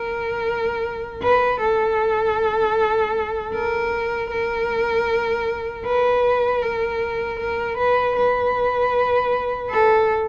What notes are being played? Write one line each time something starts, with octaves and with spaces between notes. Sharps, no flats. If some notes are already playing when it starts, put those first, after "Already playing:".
Already playing: A#4
B4
A4
A#4
A#4
B4
A#4
A#4
B4
B4
A4